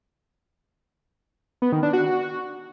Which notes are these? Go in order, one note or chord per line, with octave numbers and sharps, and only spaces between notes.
B3
D#3
D4
F#4